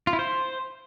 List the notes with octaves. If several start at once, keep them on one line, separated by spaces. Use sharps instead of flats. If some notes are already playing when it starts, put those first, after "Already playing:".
F4
E4
C5